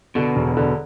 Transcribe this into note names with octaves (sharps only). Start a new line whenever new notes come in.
B2 D3
E1
D3